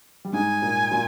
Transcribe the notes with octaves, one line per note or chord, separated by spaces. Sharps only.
G3
G#2 G#3 G#5
A#2 A#3
A#2 A#3